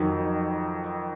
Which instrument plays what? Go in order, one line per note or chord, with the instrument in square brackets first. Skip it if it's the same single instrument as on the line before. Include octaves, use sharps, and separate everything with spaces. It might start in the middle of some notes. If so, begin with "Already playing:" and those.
Already playing: [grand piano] F2 D#3 F#3